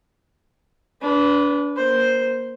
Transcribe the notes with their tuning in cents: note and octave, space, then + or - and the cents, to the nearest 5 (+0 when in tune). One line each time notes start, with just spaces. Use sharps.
D4 -30 B4 +0
A#3 +15 C5 +0